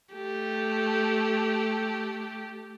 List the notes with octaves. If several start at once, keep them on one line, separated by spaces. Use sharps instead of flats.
A3 G4